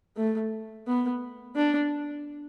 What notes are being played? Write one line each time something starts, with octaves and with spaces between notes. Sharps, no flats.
A3
B3
D4